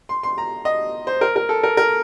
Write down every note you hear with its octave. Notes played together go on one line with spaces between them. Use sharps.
C6
C6
A#5
D#5
C5
A#4
A#4
A4
A#4
A#4